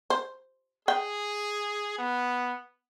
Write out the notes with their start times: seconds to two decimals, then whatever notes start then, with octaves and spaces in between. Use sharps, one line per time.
0.10 C5
0.88 G#4 G5
1.98 B3